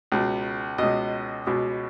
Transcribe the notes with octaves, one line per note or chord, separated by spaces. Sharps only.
C#2 B2
C#2 B2 D#5
C#2 B2